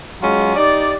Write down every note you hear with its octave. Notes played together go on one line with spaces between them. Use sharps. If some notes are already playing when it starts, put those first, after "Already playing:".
F#3 G#3 C#4 F4
D#4 G4 D5